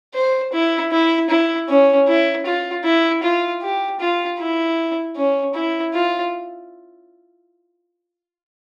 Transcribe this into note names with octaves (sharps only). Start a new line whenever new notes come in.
C5
E4
E4
E4
C#4
E4
F4
E4
F4
G4
F4
E4
C#4
E4
F4